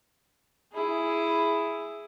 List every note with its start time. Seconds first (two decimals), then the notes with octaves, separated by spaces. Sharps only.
0.73 E4 G#4